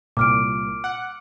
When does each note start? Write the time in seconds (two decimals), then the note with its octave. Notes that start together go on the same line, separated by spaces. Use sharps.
0.17 C2 A#2 D6 F6 D7
0.84 F#5